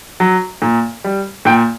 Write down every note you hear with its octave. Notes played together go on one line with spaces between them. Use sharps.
F#3
A#2
G3
A#2 G5